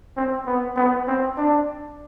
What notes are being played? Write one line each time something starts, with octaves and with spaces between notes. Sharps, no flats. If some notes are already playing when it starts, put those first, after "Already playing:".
C4
B3
B3
C4
D4